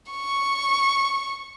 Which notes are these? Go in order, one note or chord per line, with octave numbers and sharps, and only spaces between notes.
C#6